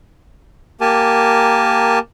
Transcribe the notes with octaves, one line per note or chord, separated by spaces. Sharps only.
A#3 G4 A#4 G#5 A5